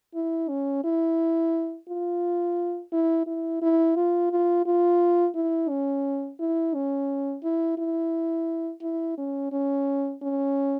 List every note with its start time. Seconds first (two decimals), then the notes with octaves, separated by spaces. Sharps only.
0.15 E4
0.49 C#4
0.84 E4
1.88 F4
2.92 E4
3.27 E4
3.62 E4
3.96 F4
4.31 F4
4.66 F4
5.35 E4
5.69 C#4
6.40 E4
6.75 C#4
7.43 E4
7.78 E4
8.82 E4
9.18 C#4
9.52 C#4
10.22 C#4